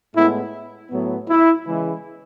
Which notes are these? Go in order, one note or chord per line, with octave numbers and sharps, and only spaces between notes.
A2 G#3 B3 E4
A2 F#3 B3
E4
C#3 E3 G#3